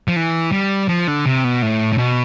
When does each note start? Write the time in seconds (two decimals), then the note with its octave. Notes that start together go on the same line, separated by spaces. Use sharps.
0.08 F3
0.16 E3
0.52 G3
0.89 F3
1.07 D3
1.26 C3
1.44 B2
1.62 A2
1.93 A2
1.98 B2